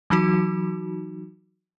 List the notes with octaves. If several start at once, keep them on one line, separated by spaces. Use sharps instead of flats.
E3 F#3 D#4 F#4